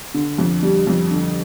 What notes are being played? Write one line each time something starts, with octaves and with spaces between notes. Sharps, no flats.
D3
F2
G3
F2
D3